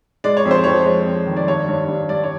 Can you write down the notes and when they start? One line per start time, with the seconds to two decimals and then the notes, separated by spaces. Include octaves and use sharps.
0.24 G#3 D5
0.37 C#5
0.45 F2
0.51 C5
0.64 F2 C#5
0.85 G#3
1.06 F2
1.27 D#3
1.37 D5
1.48 G2 C#5
1.69 G2
1.89 G2
2.09 G2 D5
2.24 C#5